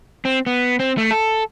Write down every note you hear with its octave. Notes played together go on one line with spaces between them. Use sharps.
C4
B3
C4
A3
A4